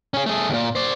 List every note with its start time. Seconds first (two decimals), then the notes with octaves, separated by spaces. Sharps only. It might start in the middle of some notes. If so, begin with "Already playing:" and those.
0.14 C#4 G#4
0.26 A3 G#4
0.50 D#2 A#2
0.75 C5 D5